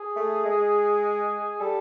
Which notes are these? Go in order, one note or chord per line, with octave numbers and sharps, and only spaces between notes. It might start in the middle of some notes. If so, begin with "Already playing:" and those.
Already playing: G#4
A3
G#3
G3 A4